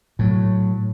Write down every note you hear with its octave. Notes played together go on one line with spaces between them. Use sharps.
A2 F#3